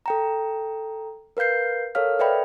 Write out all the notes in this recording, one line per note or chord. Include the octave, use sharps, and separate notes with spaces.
A4 G5 A#5
A#4 B4 F5 G6 C7
A4 A#4 C#5 F5 F6
A4 B4 D5 E5 G5 B5